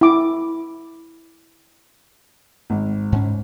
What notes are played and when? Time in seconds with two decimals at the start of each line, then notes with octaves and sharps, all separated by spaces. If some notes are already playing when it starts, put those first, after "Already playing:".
0.01 E4 D6
2.70 G#1
3.12 G#2 C#4